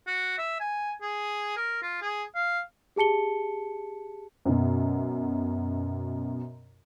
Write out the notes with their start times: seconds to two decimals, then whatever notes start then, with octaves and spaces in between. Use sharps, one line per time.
0.07 F#4
0.38 E5
0.60 G#5
1.01 G#4
1.56 A#4
1.82 F4
2.01 G#4
2.35 F5
2.96 G4 G#4 A5 C#7 G7
4.45 F#2 B2